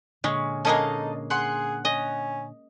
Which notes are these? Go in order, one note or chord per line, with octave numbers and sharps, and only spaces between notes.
A#2 D3 G#3 C#4
G#3 A#3 C#4 D#4 A4 D#5 A#5
G#4 F#5 C6
C#4 D#5